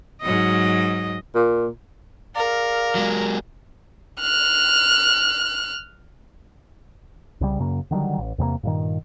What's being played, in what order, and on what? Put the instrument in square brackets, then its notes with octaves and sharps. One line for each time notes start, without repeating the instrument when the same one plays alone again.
[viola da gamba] G#2 F#3 D#5
[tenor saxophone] A#2
[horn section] G#4 D5 F5 [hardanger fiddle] A#4
[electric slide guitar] F#3 G#3
[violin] F6 F#6
[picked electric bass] C2 C#3 G3
F#2 C#3 A#3
D3 D#3 F#3 G3
A1
E2 C3 G#3 A#3
G2 A#2 D#3